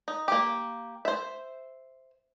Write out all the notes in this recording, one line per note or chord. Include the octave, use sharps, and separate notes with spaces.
D#4
A#3 G4
C5 E5